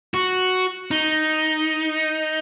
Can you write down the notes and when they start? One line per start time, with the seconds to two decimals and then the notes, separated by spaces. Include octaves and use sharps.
0.14 F#4
0.91 D#4